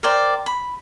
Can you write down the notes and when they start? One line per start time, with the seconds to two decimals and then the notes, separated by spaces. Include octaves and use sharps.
0.03 A#4 C5 D5 G5
0.46 B5